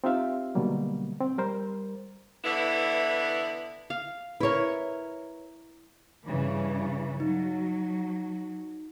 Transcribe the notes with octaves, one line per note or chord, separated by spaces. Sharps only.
C4 D#4 F4 G4 E5 F5
B2 D3 F#3 G3 A#3
C4
G3 A#4 C5
D3 E3 B3 E4
F5
E4 A#4 B4 C#5
G2 C#3 E3
F#3 D#4